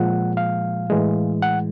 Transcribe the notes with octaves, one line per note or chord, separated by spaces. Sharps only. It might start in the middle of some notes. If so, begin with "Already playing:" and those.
Already playing: A#2 F3 G#3 F#5
F5
A2 E3 G#3
F#5